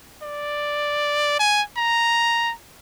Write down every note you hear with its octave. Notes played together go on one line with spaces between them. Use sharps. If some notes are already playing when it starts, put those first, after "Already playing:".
D5
G#5
A#5